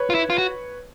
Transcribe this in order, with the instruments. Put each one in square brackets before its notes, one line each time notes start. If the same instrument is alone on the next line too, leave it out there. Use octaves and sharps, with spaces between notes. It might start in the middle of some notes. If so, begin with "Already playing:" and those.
Already playing: [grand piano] B4 C#5
[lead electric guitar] F4
E4
F4
F#4